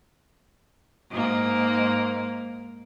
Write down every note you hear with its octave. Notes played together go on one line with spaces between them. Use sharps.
G#2 A#3